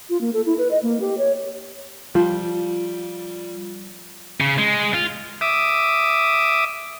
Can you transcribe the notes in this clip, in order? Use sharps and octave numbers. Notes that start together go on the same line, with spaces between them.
F4
A#3
A4
E4
B4
D#5
A#3
G4
C#5
F3 G3 F4
C#3
G#3
F4
E5 D6 D#6